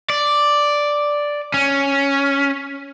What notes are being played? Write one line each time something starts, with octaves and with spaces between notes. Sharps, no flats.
D5
C#4